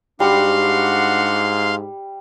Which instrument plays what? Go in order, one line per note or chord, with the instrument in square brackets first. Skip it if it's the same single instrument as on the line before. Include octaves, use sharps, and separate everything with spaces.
[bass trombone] G#2 [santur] G3 [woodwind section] D4 F#4 F#5 [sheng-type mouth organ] F5 C6